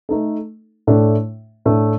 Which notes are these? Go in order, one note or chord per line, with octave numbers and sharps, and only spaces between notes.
A3 D#4 A4
A2 A3 D4
A2 A3 D4